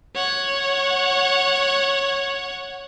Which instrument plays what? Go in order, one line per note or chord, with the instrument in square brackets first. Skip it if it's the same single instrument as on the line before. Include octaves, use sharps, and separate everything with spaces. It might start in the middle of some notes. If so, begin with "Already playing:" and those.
[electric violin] C#5 F#5